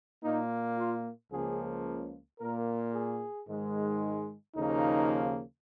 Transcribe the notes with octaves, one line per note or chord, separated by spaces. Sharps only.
A#2 A#3 D#4
F4
C#2 C#3 F3 A#3 G#4
A#2 A#3 A#4
G#4
G#2 D#3 G#3
D#2 C#3 F3 A#3 D#4